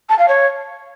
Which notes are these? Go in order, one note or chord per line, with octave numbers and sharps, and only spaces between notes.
A5
F5
C#5